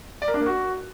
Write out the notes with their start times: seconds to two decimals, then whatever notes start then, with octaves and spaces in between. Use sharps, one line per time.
0.22 D5
0.28 A#4
0.34 D4
0.40 A#3
0.46 F#4